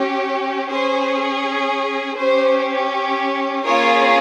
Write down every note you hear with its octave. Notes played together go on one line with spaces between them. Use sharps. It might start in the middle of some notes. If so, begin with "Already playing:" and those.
Already playing: C#4 G4
C#4 G#4 C5
C#4 G4 C5
A#3 C#4 F4 G#4 A#4 C#5